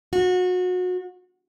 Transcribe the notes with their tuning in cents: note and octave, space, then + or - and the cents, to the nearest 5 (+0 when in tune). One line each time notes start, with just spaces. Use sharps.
F#4 -30